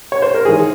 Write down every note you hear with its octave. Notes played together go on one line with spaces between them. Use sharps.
C#5
C5
A#4
G#2 E3 G#4